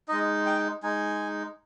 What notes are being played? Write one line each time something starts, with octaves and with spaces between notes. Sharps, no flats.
G#3 D#4 D#5
G5
G#3 D#4 G#5